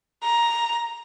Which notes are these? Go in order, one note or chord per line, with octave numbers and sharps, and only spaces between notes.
A#5